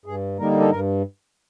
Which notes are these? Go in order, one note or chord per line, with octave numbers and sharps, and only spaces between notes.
G2 G#4
D3 G3 A#3 D#4 A#4
A4
G2 A#4